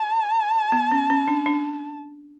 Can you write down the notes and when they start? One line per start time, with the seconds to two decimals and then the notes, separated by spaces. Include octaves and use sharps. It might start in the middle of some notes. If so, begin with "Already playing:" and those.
Already playing: A5
0.72 B3
0.92 C#4
1.10 C#4
1.28 D4
1.46 D4